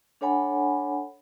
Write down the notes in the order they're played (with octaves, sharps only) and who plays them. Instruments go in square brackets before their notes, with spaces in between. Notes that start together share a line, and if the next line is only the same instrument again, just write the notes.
[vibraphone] D4 A4 C#5 F#5 G#5 B5